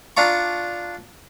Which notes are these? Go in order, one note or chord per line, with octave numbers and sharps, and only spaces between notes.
D4 F4 A#5 C#6